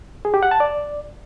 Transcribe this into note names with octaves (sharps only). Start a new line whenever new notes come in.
G#4
G4
F#5
A5
D5